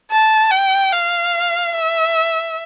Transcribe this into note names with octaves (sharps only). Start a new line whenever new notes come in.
A5
G5
F5
E5